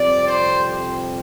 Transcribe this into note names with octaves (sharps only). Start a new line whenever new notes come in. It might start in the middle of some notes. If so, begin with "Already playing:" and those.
Already playing: F2 C3 G3 C4 D5
C5